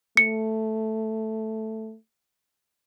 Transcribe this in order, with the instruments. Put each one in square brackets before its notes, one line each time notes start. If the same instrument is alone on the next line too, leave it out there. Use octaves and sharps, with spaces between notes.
[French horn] A3 [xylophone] C#7